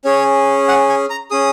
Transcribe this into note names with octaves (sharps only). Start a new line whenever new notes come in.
C#4 G#4 C#5
F#5
G#5
A#5
C#4 G#4 D#6